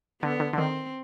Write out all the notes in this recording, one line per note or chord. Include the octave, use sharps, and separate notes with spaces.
D3 B3
D3
D3
D#3 C4